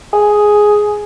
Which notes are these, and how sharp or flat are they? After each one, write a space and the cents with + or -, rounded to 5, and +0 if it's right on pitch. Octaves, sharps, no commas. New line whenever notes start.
G#4 +5